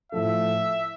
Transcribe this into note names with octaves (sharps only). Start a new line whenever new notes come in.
A2 F3 A3 E5